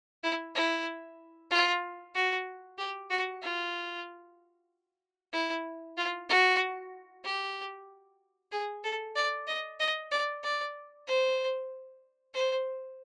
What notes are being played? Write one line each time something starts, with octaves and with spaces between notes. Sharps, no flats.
E4
E4
F4
F#4
G4
F#4
F4
E4
F4
F#4
G4
G#4
A4
D5
D#5
D#5
D5
D5
C5
C5